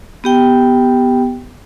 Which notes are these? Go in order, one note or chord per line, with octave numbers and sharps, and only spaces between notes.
B3 G4 G5